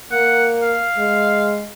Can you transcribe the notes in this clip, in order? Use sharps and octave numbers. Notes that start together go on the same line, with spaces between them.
A#3 F#5
F5
G#3